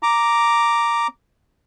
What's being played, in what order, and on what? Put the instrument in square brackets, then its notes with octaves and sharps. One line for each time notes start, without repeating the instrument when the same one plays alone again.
[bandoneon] A#5 D6